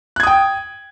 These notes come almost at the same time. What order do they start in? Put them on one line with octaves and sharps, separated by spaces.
F#6 G#6 D#6 G5